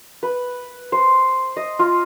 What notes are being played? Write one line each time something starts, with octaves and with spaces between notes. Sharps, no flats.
B4
C5
D#5
F4